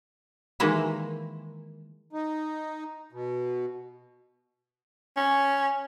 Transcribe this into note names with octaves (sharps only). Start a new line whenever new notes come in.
D#3 E3 G#3 A#3 E4
D#4
B2
C#4